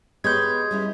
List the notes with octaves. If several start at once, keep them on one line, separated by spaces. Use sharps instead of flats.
G#3 B3 G4 C#5 G6 G#6
G3 C#4 E4